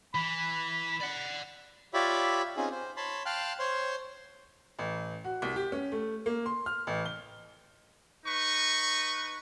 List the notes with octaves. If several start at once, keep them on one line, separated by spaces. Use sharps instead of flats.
E3 B5
D5 F#5
F4 G4 C#5 D5 E5 B5
C4 C#4 D#4 F4 G#4
C5
C#5 A5 B5 C6
F5 G5 A5 C6 F6 F#6
C5 C#5 C6
A1
F#4
C2
G4
C#4
A3
A#3
C6
F6
A1
G7
D#4 B4 C#6